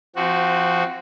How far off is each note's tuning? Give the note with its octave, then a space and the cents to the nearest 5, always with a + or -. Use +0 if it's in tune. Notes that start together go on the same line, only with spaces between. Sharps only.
F3 -25 C4 +0 F#4 +0